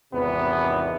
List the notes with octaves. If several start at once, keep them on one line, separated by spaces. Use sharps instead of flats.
G#1 E2 C3 B3 B4